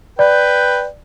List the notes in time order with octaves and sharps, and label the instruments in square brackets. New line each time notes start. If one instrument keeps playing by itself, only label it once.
[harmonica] B4 G5 [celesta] D5